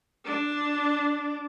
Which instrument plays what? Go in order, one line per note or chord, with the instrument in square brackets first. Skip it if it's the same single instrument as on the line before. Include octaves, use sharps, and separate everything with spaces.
[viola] D4